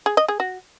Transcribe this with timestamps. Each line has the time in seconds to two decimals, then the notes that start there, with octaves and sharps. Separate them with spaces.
0.06 G#4
0.17 D#5
0.28 G#4
0.40 F#4